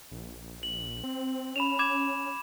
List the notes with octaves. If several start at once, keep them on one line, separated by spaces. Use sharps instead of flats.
A#1
F#7
C4
C#4 B5 E7 F7
D6 G#6 E7